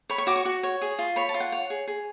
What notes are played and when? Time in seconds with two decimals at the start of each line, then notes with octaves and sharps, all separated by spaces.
0.10 C#5 B5
0.18 C#6
0.27 F#4 D6
0.36 C#6
0.45 F#4
0.63 C#5
0.81 G#4
0.99 F4
1.16 C#5 B5
1.29 A5
1.34 F4
1.40 F#5
1.52 C#5
1.70 G#4
1.88 G#4